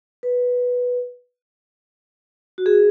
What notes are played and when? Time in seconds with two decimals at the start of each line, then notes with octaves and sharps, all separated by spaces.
0.23 B4
2.58 F#4
2.66 G#4